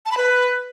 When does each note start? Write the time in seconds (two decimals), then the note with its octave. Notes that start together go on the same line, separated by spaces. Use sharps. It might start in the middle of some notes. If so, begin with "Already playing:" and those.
0.06 A5
0.11 B5
0.17 B4